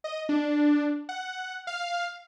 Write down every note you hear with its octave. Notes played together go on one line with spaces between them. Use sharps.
D#5
D4
F#5
F5